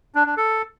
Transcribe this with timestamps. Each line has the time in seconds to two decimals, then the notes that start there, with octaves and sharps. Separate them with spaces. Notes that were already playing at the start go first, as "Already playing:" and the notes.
0.15 D4
0.26 D4
0.37 A4